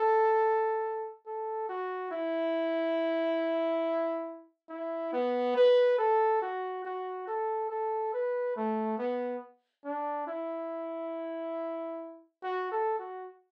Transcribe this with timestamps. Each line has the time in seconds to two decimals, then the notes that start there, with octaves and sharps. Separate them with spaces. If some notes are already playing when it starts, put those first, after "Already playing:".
Already playing: A4
1.26 A4
1.69 F#4
2.11 E4
4.69 E4
5.13 B3
5.56 B4
5.98 A4
6.42 F#4
6.85 F#4
7.27 A4
7.70 A4
8.13 B4
8.56 A3
8.98 B3
9.85 D4
10.27 E4
12.43 F#4
12.72 A4
12.99 F#4